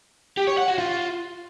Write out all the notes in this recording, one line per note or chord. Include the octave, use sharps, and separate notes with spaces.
G4
C#5
F#5
F#4
F4